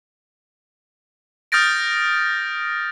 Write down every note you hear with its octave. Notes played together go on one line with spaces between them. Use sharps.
D#6 F6 G6 A6 A#6 D7